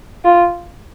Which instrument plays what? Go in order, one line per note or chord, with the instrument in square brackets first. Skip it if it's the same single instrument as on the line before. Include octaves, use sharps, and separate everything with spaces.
[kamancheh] F4